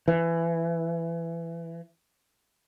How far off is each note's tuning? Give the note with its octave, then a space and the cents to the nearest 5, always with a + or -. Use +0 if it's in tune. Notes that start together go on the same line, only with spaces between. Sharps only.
E3 +20